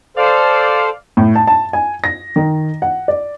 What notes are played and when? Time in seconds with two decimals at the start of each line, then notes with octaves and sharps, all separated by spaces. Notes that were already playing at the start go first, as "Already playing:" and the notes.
0.17 A4 C5 D5 F5
1.17 A2
1.35 A5
1.47 A5
1.73 G#5
2.04 A#6
2.36 D#3
2.82 F#5
3.08 D5